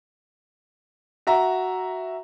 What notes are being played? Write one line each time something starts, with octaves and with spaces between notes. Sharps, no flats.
F#4 E5 A#5